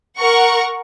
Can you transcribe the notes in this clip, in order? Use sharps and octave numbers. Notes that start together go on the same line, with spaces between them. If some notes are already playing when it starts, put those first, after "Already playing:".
A#4 F#5 C#6